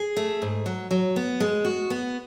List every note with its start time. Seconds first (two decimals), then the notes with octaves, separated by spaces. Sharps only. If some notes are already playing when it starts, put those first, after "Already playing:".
Already playing: G#4
0.17 A3
0.42 G#2
0.66 F#3
0.91 F#3
1.16 B3
1.40 G#3
1.65 F#4
1.90 B3